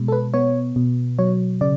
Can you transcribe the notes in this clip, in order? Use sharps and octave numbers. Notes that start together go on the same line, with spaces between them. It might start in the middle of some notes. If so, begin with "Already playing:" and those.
Already playing: B2 G#3
A4
B4
B3 C#5
B2
F#3 C#5
C#3 D5